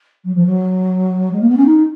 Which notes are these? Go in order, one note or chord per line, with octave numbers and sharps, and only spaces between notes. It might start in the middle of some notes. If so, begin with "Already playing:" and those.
F#3
F3
F#3
G#3
A#3
B3
C#4
D#4